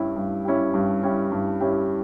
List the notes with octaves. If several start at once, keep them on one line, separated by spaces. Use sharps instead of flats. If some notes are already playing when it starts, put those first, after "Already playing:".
Already playing: G2 G3 C#4 E4 G4
G2
G3 C#4 E4 G4
G2
G3 C#4 E4 G4
G2
G3 C#4 E4 G4